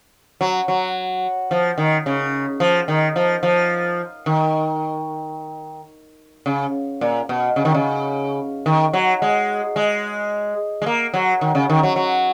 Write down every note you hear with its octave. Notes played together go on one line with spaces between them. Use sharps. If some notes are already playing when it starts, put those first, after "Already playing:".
F#3
F#3
F3
D#3
C#3
F3
D#3
F3
F3
D#3
C#3
A#2
B2
C#3
D#3
C#3
D#3
F#3
G#3
G#3
G#3
A#3
F#3
D#3
C#3
D#3
F#3
F#3